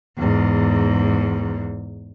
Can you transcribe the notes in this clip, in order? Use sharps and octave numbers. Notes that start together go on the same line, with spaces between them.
E2 G#2